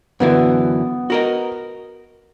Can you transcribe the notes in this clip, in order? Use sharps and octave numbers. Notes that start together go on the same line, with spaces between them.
F#2 D3 E3 B3
F#4 A#4 D#5